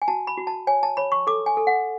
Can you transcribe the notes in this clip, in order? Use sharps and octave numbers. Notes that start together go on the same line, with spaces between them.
G#5
F#4 A5
B5
F#4
A5
C#5 G#5
A5
C#5 B5
C#6
A4 D6
G#5
A4
F#5